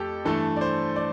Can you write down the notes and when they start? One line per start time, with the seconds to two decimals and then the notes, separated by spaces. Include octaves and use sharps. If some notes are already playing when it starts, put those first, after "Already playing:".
Already playing: F2 A3 G4 A4
0.25 G2 E3 A3 A4
0.56 D5
0.61 C5
0.96 D5